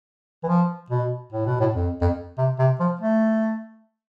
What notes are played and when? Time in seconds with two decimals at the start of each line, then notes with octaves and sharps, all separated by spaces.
0.44 E3
0.48 F3
0.90 B2
1.32 A2
1.46 B2
1.60 A2
1.74 F2
2.01 F2
2.38 C3
2.59 C3
2.80 F3
3.01 A3